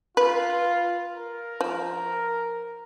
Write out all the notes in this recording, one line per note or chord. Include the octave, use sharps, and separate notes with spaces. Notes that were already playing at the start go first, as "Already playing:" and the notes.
F4 B4
A#4
F3